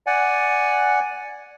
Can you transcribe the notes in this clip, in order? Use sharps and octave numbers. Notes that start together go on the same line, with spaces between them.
D5 F#5 G#5